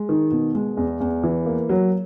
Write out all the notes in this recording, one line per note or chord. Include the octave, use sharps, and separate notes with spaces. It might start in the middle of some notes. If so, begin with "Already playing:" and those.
Already playing: G#3
D#3
B2
G#3
E2
E2
E3
A#3
F#3